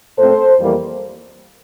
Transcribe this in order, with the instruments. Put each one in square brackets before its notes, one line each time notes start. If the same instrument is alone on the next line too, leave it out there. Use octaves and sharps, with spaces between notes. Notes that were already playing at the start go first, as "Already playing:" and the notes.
[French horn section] A#2 A3 C4 A4 C5
F2 E3 G3 A#3